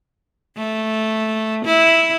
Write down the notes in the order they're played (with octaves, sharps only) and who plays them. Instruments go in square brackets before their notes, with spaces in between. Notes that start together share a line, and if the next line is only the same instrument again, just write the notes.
[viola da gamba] A3
E4